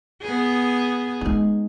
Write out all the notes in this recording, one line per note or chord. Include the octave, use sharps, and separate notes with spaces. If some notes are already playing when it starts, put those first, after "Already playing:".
B3 G#4
G#3 D#4